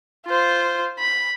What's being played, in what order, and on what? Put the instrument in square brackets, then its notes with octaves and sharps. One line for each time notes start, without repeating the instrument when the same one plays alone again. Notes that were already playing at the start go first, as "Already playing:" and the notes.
[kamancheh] F4 C5
B5